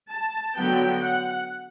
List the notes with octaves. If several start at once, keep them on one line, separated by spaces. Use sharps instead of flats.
A5
D3 F#3 B3 G5
F#5